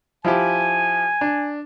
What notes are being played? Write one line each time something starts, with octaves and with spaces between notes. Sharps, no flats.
F3 E4 G4 G#5
D4